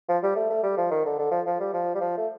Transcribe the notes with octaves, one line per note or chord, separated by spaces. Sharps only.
F3
G3
A3
A3
G3
F3
D#3
D3
D3
F3
F3
G3
F3
G3
F3
A3